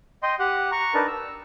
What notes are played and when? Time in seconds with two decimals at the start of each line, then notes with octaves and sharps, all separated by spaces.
0.23 D#5 G5 C6
0.39 G4 F#5
0.72 A#5 C#6
0.94 D4 D#4 A#4 B4 A5
1.08 E6